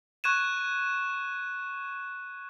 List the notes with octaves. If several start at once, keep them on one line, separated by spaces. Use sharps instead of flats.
C#6 F#6 G#6 D#7 E7